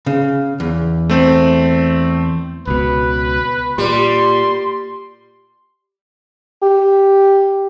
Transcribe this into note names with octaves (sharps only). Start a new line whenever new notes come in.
C#3
E2
A3 C4
C#2 B2 B4
A#2 G3 C6
G4